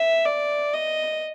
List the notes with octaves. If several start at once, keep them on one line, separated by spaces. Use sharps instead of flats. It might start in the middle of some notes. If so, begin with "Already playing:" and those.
Already playing: E5
D5
D#5